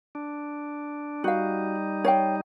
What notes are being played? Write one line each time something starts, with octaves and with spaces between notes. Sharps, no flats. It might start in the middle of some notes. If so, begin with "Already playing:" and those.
D4
G3 D#4 F#4 F5
C#5 F5 G5